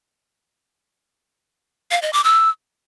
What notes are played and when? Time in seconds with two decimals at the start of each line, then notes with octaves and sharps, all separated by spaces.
1.91 F5
2.02 D#5
2.13 D6
2.24 E6